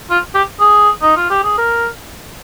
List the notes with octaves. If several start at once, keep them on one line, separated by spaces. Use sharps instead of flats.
F4
G4
G#4
D#4
F4
G4
G#4
A#4